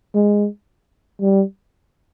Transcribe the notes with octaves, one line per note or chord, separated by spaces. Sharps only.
G#3
G3